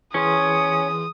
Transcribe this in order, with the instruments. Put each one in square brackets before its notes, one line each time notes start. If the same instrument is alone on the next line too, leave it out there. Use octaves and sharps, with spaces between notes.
[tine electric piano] E3 G#4 C6 [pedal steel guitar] C#4 [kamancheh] D#6